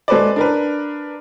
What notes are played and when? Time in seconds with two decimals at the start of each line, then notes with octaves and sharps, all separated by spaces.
0.08 G#3 A4 B4 C5 D5
0.36 D4 A#4 B4